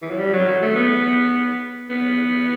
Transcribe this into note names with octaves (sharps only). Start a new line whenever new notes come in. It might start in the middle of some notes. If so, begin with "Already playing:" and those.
E3
F#3
G3
F#3
F#3
A3
B3
B3